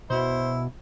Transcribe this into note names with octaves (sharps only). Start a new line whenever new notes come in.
B2 E4 C5